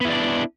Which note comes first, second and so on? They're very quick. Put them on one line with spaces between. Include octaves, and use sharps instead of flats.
B3 E4 D5 D4